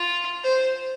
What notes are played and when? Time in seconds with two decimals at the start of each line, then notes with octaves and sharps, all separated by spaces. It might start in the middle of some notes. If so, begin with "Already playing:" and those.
Already playing: F4
0.44 C5